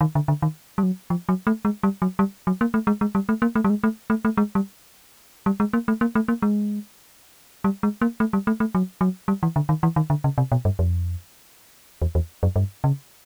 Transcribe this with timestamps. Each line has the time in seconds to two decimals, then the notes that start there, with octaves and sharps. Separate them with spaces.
0.01 D#3
0.15 D3
0.28 D3
0.42 D#3
0.78 G3
0.83 F#3
1.10 F3
1.29 F#3
1.47 A3
1.65 G#3
1.83 G3
2.02 F#3
2.19 G3
2.47 F#3
2.61 A#3
2.74 A3
2.87 G#3
3.01 G#3
3.15 G3
3.29 A3
3.42 A#3
3.55 A3
3.64 G3
3.70 G#3
3.84 A3
4.10 A3
4.25 A3
4.37 G#3
4.55 G3
5.46 G3
5.60 G#3
5.73 A#3
5.88 A3
6.01 A#3
6.15 A3
6.28 A#3
6.42 G#3
7.64 G3
7.83 G#3
8.02 A#3
8.20 A3
8.33 G3
8.47 A3
8.60 A3
8.75 F#3
9.01 F#3
9.28 G3
9.43 E3
9.56 D3
9.69 D#3
9.83 E3
9.96 D#3
10.10 D3
10.24 C#3
10.38 C3
10.52 B2
10.65 G2
10.79 F2
12.02 E2
12.15 E2
12.43 F#2
12.56 G2
12.84 C#3